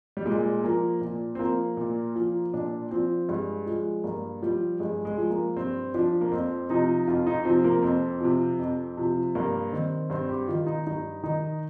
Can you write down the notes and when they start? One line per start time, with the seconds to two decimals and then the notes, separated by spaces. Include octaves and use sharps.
0.17 G3
0.26 A#2 G#3
0.64 F3 A#3
1.01 A#2
1.35 C4
1.39 F3 A#3
1.77 A#2
2.16 F3
2.54 A#2 D4
2.91 F3 C4
3.28 G2 G#3
3.66 F3 G#3
4.04 G2 A#3
4.42 F3 G3
4.80 G2 G#3
5.05 G#3
5.17 F3
5.30 A#3
5.56 G2 C4
5.94 F3 D4
6.21 A#3
6.31 F2 C4
6.70 C3 F3 D#4
7.07 F2 F4
7.27 D#4
7.45 C3 F3 C4
7.64 A#3
7.83 F2 C4
8.20 C3 F3
8.59 F2
8.97 C3 F3
9.35 G2 A#3
9.72 D#3 C4
10.10 G2 C4
10.29 G4
10.48 D#3 F4
10.67 D#4
10.87 G2 D#4
11.23 D#3 D#4